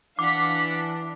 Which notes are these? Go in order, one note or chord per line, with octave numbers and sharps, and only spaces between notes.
E3 D4 F5 F#5 D6 B6